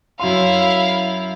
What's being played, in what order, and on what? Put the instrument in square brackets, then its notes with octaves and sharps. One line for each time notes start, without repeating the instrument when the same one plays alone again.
[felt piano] F#2 C6 [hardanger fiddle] E4 F5